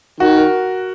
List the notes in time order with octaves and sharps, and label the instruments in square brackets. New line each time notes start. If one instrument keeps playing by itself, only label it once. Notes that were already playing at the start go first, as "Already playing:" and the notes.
[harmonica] D#3 [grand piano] F#4
[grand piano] A#4